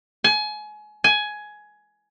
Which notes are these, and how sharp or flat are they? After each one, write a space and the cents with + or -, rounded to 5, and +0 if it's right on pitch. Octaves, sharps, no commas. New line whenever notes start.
G#5 +30
G#5 +15